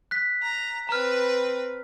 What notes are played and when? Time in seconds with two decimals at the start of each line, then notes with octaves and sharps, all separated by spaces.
0.11 F#6 B6
0.42 A#5
0.89 C4 B4 A#5 F6